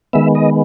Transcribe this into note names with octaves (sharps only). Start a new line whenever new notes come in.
D#3 G#3 B3 E5
D#5